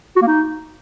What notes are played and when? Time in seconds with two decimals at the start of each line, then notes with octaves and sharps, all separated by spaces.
0.16 F#4
0.22 A#3
0.27 D#4